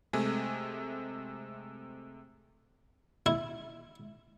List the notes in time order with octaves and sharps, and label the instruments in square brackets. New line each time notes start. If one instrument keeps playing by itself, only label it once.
[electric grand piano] C3 G#3 A3 G#5
[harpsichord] E4